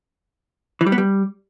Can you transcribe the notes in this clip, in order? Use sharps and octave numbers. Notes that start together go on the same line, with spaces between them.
E3
G3
B3
G3